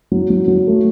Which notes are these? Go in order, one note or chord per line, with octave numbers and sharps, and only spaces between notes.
F#3
F#3
F#3
A3